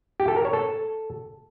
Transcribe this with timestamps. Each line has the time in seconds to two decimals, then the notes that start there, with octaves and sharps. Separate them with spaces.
0.20 G4
0.28 A4
0.36 A#4
0.45 C#5
0.53 A4